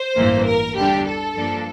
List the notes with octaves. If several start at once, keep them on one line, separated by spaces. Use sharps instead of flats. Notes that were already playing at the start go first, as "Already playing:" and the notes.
Already playing: C5
A1 G2 E3 A#3
A#4
E2 D3 G3 D4 G4
A4
G2 F3 A#3 D4